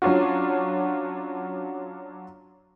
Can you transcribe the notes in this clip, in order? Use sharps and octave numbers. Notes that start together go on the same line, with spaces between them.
F#3 C#4 D4 F4 F#4